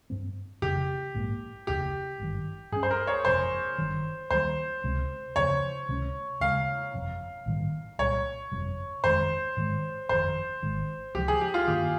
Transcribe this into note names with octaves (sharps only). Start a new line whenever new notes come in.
G2 G3 C4
F1 F2 C#3 G4
A#1 G#2 F3 A#3
F1 D#2 C#3 G4
G#1 G2 D#3
G2 G3 C#4 G#4
C5
A#4
C#5
G1 F2 C3 C5
G1 G2 D#3
D#2 D#3 G3 C5
C#2 C3 G3 C4
F1 D#2 C#3 F3 C#5
C#2 C3 G3 C#4
D#2 C#3 G#3 F5
G1 F2 C3
A#1 G#2 D#3 G3
C2 A#2 G3 C#5
G1 F2 C3 G3
G1 F2 D#3 G#3 C5
G#2 D#3 G#3
G1 F2 D#3 C5
G#1 G#2 D#3
C#2 C3 F3 G4
G#4
G4
F4
G2 D#3 A#3 G4